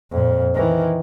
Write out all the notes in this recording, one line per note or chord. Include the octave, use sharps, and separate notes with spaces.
F2 A#2
D#3 E3